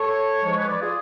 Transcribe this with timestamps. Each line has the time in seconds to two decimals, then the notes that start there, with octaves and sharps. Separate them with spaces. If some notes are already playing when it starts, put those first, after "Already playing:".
Already playing: A4 C#5
0.43 G#2 F3 G#3 C#5
0.55 G#4 B4
0.63 C#5
0.67 B4 D5
0.81 F4 G#4